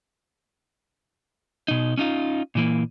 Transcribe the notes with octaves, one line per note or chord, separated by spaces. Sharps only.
B2 D#4
C#4 D#4 F4
A#2 E3 A#3